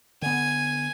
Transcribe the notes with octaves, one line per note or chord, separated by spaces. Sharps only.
D3 B3 G#5